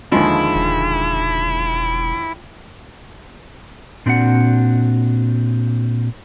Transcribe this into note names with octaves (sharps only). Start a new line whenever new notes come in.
D#2 D3 F3 G#3 E4 G#4
E1
A#2 C4 D4 F#4 A#4 F#5